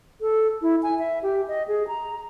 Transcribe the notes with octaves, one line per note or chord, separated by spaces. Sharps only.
A4
E4
G#5
E5
G4
D#5
G#4
A#5